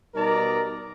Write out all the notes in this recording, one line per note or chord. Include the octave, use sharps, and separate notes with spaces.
B2 G3 D#4 A#4 D5 A#5